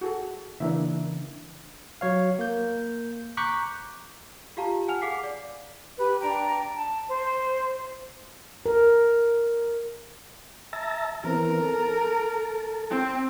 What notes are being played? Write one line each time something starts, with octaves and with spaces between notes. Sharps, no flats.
F#4 G#4 A4
C#3 E3 A#3 D4 D#4 E5
F#3 C#5 F5
A#3 G6
A#5 C#6 D6 F#6 G6 B6
F4 G4 F5 A5 A#5
F#5 G#5 F6 F7
G#4 F5 F#5 D6 B6 C7
D5
G4 B4
D4 G5 A#5 D6
A5
C5
A#4
E5 A5 A#5
E3 B3 C4 A#4
A4
C4